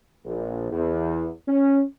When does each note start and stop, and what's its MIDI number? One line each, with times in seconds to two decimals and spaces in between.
0.25 0.70 34
0.72 1.28 40
1.48 1.81 61